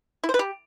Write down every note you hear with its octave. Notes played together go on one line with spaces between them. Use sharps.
E4
C5
B4
G4